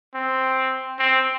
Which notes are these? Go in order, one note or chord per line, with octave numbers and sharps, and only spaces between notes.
C4
C4